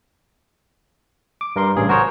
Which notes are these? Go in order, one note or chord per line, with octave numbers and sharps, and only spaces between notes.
D6
G2 A#4 C6
A1 G2 C#3 G#4
F#4 A#4 C5 C#5